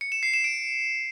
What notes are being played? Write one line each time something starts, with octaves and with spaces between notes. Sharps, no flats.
C#7
E7
C7
E7
D7